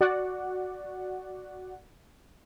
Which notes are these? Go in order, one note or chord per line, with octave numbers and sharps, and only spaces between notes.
F#4 D5 F#5